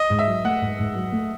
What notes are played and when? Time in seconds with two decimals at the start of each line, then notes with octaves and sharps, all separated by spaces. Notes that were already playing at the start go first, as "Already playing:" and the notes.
Already playing: D#5
0.10 G#2
0.19 E5
0.27 F#3
0.44 A3 F#5
0.61 G#2
0.79 G#2
0.95 F#3
1.12 A3